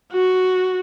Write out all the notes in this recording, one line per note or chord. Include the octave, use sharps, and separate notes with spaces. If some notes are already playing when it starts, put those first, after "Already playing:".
F#4